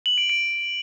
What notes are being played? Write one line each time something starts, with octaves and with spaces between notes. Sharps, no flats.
F#7
D7
D7